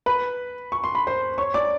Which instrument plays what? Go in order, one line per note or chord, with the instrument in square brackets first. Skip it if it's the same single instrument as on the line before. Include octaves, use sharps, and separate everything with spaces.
[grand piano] B4 B5
C#6
C6
B5
C5 C6
C#5 C#6
D5 D6